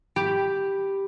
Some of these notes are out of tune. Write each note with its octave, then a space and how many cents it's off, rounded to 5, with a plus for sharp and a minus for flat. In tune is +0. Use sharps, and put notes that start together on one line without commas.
G4 +0 B5 +0